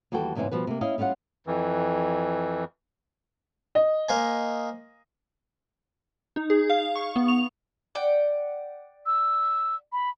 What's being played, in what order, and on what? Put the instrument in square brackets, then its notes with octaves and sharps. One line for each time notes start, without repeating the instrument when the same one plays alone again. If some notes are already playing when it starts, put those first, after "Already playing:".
[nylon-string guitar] D#2 E3 G3 F#4 A4 G5
E2 G#2 C#3 E3 G#3 C4
B2 F3 G3 B4
C3 A#3
C#4 E4 D#5 F5
G3 C#4 F4 F5 F#5
[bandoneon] F2 E3
[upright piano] D#5
[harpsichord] A#3 C5 G#5
[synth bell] D#4
G#4
F5
C#6
B3
F7
[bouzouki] D5 F#5 G5
[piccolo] E6
B5